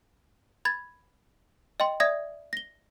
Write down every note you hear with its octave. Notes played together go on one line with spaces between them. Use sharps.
B5 G#6 A6
D#5 G5 C6
D5 E5 D#6 G#6 A#6
A#6 G7